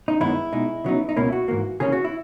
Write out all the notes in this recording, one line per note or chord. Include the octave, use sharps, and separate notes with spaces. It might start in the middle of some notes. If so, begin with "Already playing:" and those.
D#4
F#2 D#3 G#3 B3 D#4 E4
B2 G#3 D#4
C#3 F#3 B3 D#4
D#4
C#2 B2 A#3 C#4 E4
F#4
G#2 E3 A#3
C#3 E3 A#3 C#4 G#4
F#4
E4